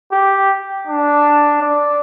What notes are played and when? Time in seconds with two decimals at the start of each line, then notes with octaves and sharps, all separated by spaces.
0.12 G4
0.87 D4
1.62 D5